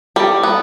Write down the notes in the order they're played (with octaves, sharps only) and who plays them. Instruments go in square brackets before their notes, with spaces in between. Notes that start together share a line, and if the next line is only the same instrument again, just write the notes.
[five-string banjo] G3 [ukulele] A4 D#5 G5
[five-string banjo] B3